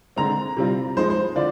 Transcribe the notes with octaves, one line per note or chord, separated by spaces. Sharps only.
D3 G#3 C4 A#5
C3 G3 C4 F4
F3 G#3 D#4 C5
C5
D3 D4 F4 D5